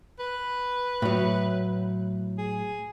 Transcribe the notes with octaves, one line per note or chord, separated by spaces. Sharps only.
B4
A2 F#3
G#4